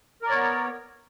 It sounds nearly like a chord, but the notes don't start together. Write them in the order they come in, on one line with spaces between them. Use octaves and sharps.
A#4 D5 C#5 B3